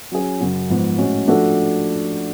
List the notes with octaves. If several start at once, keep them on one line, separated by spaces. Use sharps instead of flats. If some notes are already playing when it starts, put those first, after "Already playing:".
F#3 C#4 G#4
F#2 C#3 F#3
G#2 F3 B3
A2 G#3 C#4 F#4
F3 A3 D4 F#4 A4